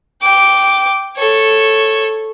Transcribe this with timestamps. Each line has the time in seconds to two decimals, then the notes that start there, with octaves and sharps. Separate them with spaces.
0.22 G5 D6
1.17 A4 C#5